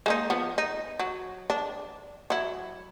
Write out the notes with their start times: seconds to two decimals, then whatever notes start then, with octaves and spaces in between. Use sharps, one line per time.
0.06 G#3 A#3 D#4
0.30 F3 B3
0.58 D#4
1.00 F#3
1.50 D4
2.30 F#3 E4